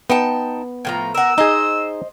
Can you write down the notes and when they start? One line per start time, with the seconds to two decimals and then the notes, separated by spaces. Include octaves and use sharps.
0.10 B3 D#4 G5 A5
0.85 A2 F3 A#5
1.15 A#4 F#5 E6
1.38 D#4 G#4 C5 D#5